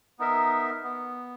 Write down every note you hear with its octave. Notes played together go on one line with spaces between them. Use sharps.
B3 D#4 A#4 E5
B3